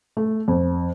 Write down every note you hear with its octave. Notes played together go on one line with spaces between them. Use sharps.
A3
F2